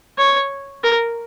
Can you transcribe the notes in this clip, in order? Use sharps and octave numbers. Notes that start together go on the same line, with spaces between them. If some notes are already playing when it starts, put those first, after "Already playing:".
C#5
A#4